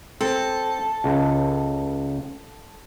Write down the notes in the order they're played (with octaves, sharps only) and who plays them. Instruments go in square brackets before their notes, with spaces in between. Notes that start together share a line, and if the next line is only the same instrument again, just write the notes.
[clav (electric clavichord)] C4 [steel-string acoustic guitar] A4
[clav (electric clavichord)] C#2